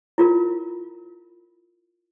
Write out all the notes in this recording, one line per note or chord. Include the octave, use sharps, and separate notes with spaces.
E4 F4 A#4